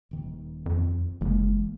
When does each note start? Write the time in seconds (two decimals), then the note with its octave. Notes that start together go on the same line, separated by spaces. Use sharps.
0.11 D#1 D#3
0.66 F2
1.21 F#1 E3 G#3 A#3